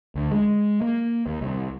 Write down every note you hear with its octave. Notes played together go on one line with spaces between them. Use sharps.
D2
G#3
A#3
D#2
C2